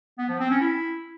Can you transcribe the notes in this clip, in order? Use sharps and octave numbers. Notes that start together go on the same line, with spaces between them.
B3
F3
C4
C#4
E4